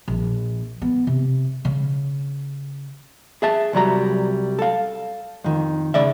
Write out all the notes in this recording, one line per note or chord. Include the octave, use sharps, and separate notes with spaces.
A#1
B3
C3
C#3
G#4 E5 A5
C2 F#3 G3 A#5
A4 F5
F2 D#3
C#3 D5 E5